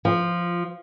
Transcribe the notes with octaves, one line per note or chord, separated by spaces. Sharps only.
F3